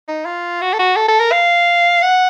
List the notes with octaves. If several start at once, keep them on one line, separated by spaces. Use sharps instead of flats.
D#4
F4
F#4
A4
F#4
A4
A4
A#4
F5
F#5